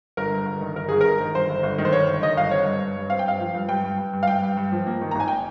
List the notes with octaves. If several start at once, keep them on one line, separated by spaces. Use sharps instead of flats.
G1 A#4
G2
G1
D#3
G1 A#4
G1 G#4
G1 A#4
D#3
G1 C5
G1
G1
D#3
C5
G1 C#5
G1
D#3 D#5
G1 F5
C4 C#5
G2
G2
G2
C4 F5
G5
G2 F5
F3
G2
G2 G5
G2
G2
G2
F5
G2 G5
G2
G2
F3
A#3
D#3
A#5
G#1 G#5
G5